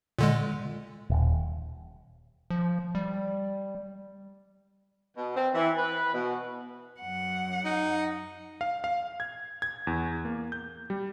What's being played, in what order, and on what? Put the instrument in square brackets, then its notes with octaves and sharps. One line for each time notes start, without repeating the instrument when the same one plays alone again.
[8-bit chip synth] A#2 D3 G#3
[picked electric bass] D#1
[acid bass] F3
G3
[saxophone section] B2
C4
E3
B4
B2
[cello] F#2 F#5
[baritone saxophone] D#4
[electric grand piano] F5
F5
G#6
G#6
E2
A#3
G6
G3